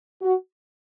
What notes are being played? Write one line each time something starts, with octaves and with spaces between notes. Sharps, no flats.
F#4